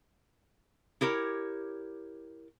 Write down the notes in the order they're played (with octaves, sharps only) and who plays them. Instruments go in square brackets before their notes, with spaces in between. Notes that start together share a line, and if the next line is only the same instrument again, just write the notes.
[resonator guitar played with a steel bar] E4 G4 A#4 C#5